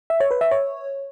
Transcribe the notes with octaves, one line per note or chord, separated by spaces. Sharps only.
E5
C#5
B4
E5
C#5